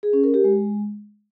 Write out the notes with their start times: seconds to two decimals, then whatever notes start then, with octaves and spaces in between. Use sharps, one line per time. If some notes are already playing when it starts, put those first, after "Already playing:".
0.03 G#4
0.13 C#4
0.24 A#4
0.34 G4
0.44 G#3